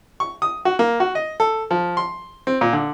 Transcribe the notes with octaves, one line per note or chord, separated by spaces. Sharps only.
C#6
D#6
F#4
A#3
F#4
D#5
A4
F3
C6
C4
A#2
D3